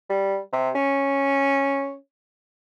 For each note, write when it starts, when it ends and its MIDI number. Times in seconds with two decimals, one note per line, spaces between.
0.10 0.39 55
0.53 0.70 48
0.75 1.95 61